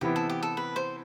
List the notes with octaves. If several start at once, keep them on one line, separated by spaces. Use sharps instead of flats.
C3 E3 B3 E4 G4
A4
G4
A4
B4
C5